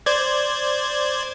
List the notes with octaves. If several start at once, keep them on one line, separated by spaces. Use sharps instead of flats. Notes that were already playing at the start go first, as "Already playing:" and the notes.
C5 D5 G#6